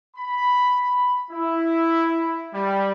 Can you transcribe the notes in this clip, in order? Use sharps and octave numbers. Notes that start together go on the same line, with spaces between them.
B5
E4
G3